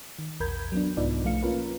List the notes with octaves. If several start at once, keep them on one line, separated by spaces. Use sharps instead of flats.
D#3
A#1 E2 A#4 B5 G6 G#6
F#3 B3 D4
C2 G#2 B3 D#4 F4 D5
B1 F3 A3 F5 C#7
A#3 C#4 F4 A#4 B4